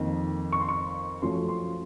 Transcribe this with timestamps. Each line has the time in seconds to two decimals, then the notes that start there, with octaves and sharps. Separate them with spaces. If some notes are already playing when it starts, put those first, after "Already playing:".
Already playing: F2 D#3 A#3 D#4
0.52 C#6
0.60 C6
0.69 C#6
1.22 F#2 F3 A3 C#4 C6
1.48 C6